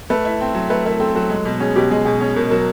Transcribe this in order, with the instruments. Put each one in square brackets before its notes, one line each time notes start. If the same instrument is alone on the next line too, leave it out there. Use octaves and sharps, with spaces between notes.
[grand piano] A3 [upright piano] B4
[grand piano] E4
C4
F#3
[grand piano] A3 [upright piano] B4
[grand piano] E4 [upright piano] A#4
[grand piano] C4 [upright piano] A4
[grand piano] F#3 [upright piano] A4
[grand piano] G#3
B2
[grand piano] C#4 [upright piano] G#4
[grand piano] B2 [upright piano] G4
[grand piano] G#3 [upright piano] G#4
[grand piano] B2 [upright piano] G#4
[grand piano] C#4 [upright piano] G#4
[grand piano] B2 [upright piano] A#4
[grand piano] F#3 [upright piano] A#4